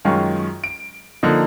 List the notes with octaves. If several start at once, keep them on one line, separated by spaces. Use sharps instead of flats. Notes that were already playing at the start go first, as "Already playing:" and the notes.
F#2 D#3 G#3 C#4 F4
D7
D3 F3 A#3 D#4